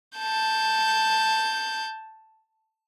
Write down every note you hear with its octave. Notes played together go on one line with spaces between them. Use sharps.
A5 G6